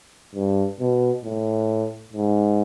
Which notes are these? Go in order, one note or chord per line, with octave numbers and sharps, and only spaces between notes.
G2
B2
A2
G#2